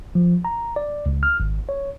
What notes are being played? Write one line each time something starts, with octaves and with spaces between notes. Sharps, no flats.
F3
A#5
D5
C#2
F6
G#1
C#5